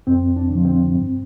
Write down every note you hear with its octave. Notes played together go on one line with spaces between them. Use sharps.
F2 C4
D4
D3 F3
C4
G2